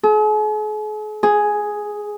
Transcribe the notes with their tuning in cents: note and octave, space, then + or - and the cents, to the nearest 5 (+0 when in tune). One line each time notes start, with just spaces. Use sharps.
G#4 +45
G#4 +5